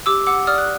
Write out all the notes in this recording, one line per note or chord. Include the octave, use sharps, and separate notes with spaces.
G4 D6 E6
F#5 D6 E6
D5 D#6 F6
F#6